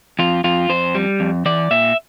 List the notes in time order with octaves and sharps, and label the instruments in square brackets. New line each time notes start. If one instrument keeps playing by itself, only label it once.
[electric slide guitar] F2 F4
F2 F4
F2 C5
G3
F2
E3 D5
A#2 E5